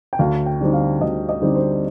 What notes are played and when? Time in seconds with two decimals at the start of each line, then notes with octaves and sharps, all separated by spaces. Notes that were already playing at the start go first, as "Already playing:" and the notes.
0.13 G5
0.19 D2 F5
0.46 G5
0.61 D3 G3 C4 D#4
0.73 F5
1.01 D2 D#5
1.29 D#5
1.42 D3 G3 C4 D#4
1.55 C5